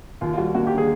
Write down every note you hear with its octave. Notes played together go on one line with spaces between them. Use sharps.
D#2 F4
F4
G3 F#4
A#3 F#4
G4
D3
G#4